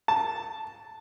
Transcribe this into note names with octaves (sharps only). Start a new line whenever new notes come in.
A5